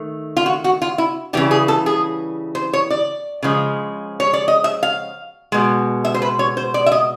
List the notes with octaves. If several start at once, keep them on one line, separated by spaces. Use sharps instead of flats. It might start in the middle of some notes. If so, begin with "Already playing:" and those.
Already playing: D#3 A3
F4
F#4
F#4
F4
E4
C#3 E3 G3 G4
G#4
A4
G#4
C5
C#5
D5
C#3 F3 G#3
C#5
D5
D#5
E5
F5
B2 G#3
E5
C5
B4
C#5
C5
D5
E5
D#5